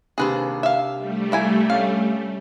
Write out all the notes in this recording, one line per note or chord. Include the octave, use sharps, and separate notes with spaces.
D#2 C3 D4 G#4 B4 C5
E5 F5 E6
G3 A3
A#3 E4 E5 G#5
C#4 F5